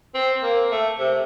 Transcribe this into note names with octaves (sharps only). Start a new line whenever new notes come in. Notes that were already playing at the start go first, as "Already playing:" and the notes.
C4
A#3
A3
C3